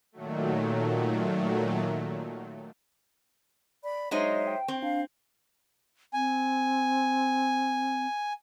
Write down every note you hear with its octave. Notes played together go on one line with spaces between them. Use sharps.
A#2 D#3 F#3 A3
D5 B5
F#3 G#3 D#4 C5 C#5 D#5 E5
G5
C4
D4 F5
C4 G#5